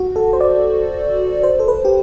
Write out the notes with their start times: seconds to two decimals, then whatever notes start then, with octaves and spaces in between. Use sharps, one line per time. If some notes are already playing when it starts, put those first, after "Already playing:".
Already playing: F#4
0.16 A4
0.33 C5
0.41 D5
1.43 C5
1.60 A4
1.68 B4
1.85 G4